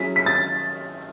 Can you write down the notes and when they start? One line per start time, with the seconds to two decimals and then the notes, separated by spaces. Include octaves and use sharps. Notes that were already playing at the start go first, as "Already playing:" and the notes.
Already playing: F#3 C#4 E4 G#4 B6
0.16 B6
0.26 A6